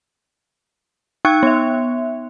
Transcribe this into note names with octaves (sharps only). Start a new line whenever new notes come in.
D#4 G5 C#6 F#6 G#6 C#7
B3 E5